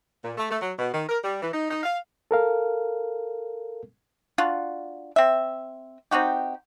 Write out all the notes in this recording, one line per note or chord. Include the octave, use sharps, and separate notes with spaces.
A#2
A3
A3
F#3
B2
D#3
A#4
G3
E3
D#4
D#4
F5
A4 A#4 F5
D4 F4 F#4
C4 E5
C4 D#4 F#4 G4